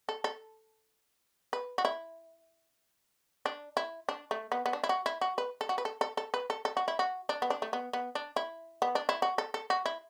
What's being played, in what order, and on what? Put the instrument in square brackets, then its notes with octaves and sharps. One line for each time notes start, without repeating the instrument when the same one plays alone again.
[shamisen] A4
A4
B4
F#4
E4
D4
E4
D4
A3
B3
B3
D4
E4
F#4
E4
F#4
B4
A4
F#4
B4
A4
A4
A4
B4
A4
A4
F#4
E4
F#4
D4
B3
D4
A3
B3
B3
D4
E4
B3
D4
E4
F#4
A4
A4
F#4
E4